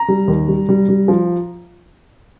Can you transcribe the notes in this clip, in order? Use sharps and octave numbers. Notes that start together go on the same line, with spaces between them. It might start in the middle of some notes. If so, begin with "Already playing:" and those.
Already playing: A#5
G3
D#2
G3
G3
G3
F3